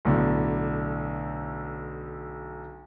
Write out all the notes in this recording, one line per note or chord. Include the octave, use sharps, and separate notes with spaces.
B1 A2 D3